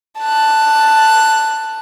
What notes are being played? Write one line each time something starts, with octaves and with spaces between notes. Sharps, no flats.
A5 F#6